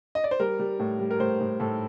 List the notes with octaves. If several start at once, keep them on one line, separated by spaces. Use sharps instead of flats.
D#5
D5
C5
G3 A#4
G3
A2
G3
A#4
A2 C5
A2
A2 A4